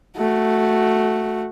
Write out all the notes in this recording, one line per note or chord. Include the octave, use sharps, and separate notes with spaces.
A3 F#4